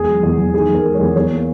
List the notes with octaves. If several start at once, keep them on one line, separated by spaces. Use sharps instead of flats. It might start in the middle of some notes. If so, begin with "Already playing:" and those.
Already playing: E2 G#3 G#4
F#3
E2
E2
D#3 G#4
E2
A#4
G#3
E2 C#5
E2 C#5
A#3